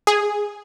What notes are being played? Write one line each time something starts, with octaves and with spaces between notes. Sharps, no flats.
G#4